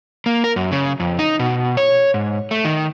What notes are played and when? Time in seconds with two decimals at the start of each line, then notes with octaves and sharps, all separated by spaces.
0.26 A#3
0.44 A#4
0.56 F#2
0.72 C#3
1.00 F2
1.19 D#4
1.39 B2
1.77 C#5
2.14 G#2
2.51 A3
2.65 D#3